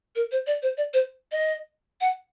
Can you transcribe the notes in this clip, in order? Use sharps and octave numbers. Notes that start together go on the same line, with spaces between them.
A#4
C5
D5
C5
D5
C5
D#5
F#5